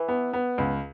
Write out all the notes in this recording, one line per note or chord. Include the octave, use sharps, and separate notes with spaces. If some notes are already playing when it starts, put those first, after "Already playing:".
Already playing: E3
B3
B3
C#2